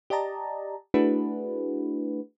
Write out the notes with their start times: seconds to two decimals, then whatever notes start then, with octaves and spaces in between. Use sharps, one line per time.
0.10 G4 D5 D#5 A5 A#5
0.94 A3 D4 E4 F#4 G#4 B4